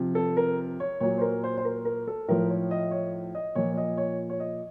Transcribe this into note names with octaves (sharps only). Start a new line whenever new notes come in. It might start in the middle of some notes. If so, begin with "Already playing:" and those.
Already playing: C3 F3
A4
A#4
C#5
A#2 F#3 C#5
C5
A#4
C5
C5
A#4
A#4
A4
A2 F3 A#4
C#5
D#5
C#5
D#5
A#2 F3 C#5
C#5
D#5
C#5
C#5
D#5